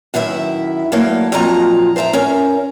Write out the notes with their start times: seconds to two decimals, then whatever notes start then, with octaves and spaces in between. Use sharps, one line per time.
0.14 F#2 D#3 E4 A#4 E5
0.92 F#3 A3 A#3 C#5 D5
1.32 F2 A#2 F3 F#3 D#5 A#5
1.96 C5 D5 E5 A5 A#5
2.13 C#4 A#4